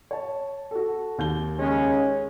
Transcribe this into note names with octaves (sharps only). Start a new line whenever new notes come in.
C#5 A5
F#4 A4
D#2 G6 G7
C#3 G#3 C#4